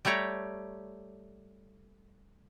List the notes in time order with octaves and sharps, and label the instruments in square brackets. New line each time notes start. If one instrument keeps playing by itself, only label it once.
[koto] G3 A3 G4 C#5 A#5